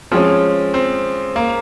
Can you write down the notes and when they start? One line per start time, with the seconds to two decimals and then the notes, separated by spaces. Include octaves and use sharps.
0.11 F3 G#3 C4 C#4
0.74 C4
1.36 A#3